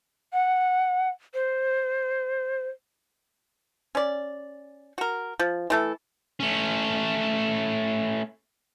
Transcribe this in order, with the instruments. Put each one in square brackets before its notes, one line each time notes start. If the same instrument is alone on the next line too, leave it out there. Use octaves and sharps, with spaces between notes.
[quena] F#5
C5
[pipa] C#4 D5
F#4 A#4
F3
E3 A3 A4
[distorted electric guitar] A3 C#4